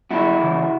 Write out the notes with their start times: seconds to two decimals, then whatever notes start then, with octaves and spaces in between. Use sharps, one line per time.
0.11 F#2 E4 F#4
0.39 C#3 E3